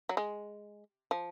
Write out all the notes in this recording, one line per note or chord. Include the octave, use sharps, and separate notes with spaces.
F#3
G#3
F3